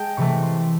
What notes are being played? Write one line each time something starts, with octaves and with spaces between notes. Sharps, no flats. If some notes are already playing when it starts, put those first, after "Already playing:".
Already playing: G#3 G5 A5
C3 E3 A3 C#6
C6